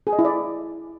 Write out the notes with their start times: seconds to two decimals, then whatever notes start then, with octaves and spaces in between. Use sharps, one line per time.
0.07 G#4
0.13 D#5
0.19 E4
0.25 D5